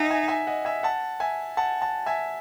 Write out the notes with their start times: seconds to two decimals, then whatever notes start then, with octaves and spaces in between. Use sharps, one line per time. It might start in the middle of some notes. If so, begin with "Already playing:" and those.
Already playing: D#4 D#5 E5 F#5 G#5
0.11 E5 G#5
0.28 E5 G#5
0.47 D#5 F#5
0.65 E5 G#5
0.83 F#5 A5
1.20 E5 G#5
1.57 F#5 A5
1.82 F#5 A5
2.06 E5 G#5